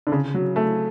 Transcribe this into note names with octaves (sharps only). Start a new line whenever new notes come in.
D3
C#3
F#3
A3